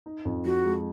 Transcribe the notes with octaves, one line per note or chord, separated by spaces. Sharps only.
D#4
F2
F3 F#4
G#3